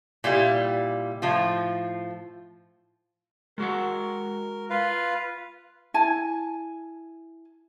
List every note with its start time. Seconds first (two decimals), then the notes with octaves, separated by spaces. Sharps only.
0.24 A#2 G3 E4 G4
1.22 A2 F3 F4
3.58 G#3 F#4 A#4 F#5
4.70 F4 B4 F5
5.94 E4 G#5 A5